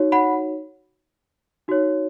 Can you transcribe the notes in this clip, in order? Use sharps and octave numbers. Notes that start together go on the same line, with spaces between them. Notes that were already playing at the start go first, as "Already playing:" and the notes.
Already playing: D#4 F#4 C#5
F#5 B5
D#4 F#4 C#5